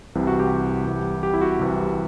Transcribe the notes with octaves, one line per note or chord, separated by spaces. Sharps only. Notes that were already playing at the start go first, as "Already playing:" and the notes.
C2 C3 E3
F#4
G4
C2 C3 E3
G4
E4
F#4
C2 C3 E3